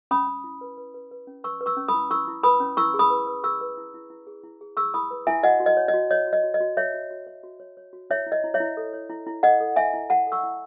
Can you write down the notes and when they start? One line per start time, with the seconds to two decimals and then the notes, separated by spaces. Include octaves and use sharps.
0.11 C#4 B5 D#6
0.27 C#4
0.44 E4
0.61 B4
0.78 B4
0.94 B4
1.11 B4
1.27 C#4
1.44 B4 C#6 E6
1.61 B4
1.66 C#6 E6
1.77 C#4
1.88 B5 D#6
1.94 E4
2.11 E4 C#6 E6
2.27 E4
2.43 B4 B5 D#6
2.60 C#4
2.77 E4 C#6 E6
2.94 G#4
2.99 B5 D#6
3.10 B4
3.27 B4
3.44 G#4 C#6 E6
3.61 B4
3.77 E4
3.94 E4
4.10 E4
4.27 G#4
4.44 E4
4.61 G#4
4.77 G#4 C#6 E6
4.94 E4 B5 D#6
5.11 B4
5.27 E4 E5 G#5
5.43 F#4 D#5 F#5
5.60 F#4
5.66 D#5
5.77 C#5
5.88 D#5
5.94 F#4
6.11 C#5 D#5
6.27 F#4
6.33 D#5
6.44 F#4
6.54 D#5
6.60 F#4
6.77 C#5 E5
6.94 F#4
7.11 F#4
7.27 C#5
7.44 F#4
7.60 C#5
7.77 C#5
7.93 F#4
8.10 E4 C#5 E5
8.26 E4
8.32 D#5
8.44 E4
8.54 C#5 E5
8.60 E4
8.77 A4
8.93 C#5
9.10 E4
9.27 E4
9.43 A4 D#5 F#5
9.60 A4
9.76 E4 E5 G#5
9.94 E4
10.10 E4 F#5 A5
10.27 A4
10.32 C#6 E6
10.43 E4